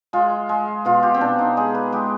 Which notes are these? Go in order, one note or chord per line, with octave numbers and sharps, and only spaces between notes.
G#3 F4
G#3
B2 F4
G4
C4
B2 D4
D#4
G#3 G#4
B4
G#3 G4